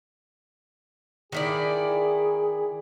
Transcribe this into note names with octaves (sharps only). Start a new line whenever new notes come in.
D#3 E4 G#4 D5